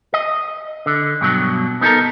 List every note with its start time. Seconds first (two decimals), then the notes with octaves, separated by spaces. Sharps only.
0.14 D#5
0.86 D3
1.21 G2 B2 F#3
1.81 B3 D#4 G4 A4 A#4